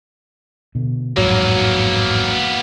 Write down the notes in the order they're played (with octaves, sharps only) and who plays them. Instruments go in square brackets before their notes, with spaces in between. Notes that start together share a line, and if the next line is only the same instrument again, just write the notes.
[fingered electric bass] B2 D3
[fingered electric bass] A1 F2 G#2 [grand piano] F#3 [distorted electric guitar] A#3 B3